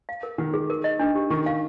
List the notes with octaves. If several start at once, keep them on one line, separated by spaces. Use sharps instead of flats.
F5
A#4
D#3 F#5
G#4
A#4
D#5
D4
G4
D#3 C#6
F5